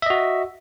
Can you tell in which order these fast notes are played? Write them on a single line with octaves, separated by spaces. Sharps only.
E5 D#5 F#4